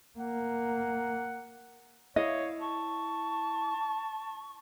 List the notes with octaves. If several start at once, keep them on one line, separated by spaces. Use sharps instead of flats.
A#3 F#5
E4 C#5 D#5 F5
A5 C#6